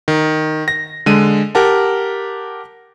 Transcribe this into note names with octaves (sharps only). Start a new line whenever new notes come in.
D#3
A#6
D3 G#3 D#7
G4 A#4 F#5 A5